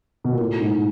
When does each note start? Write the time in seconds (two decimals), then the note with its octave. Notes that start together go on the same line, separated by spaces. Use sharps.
0.24 B2
0.32 A#2
0.39 A2
0.61 G#2